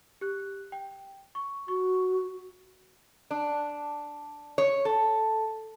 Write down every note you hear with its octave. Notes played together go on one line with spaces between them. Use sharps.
G4 F#6
G5
C#6
F#4 C#6
D4
C#5
A4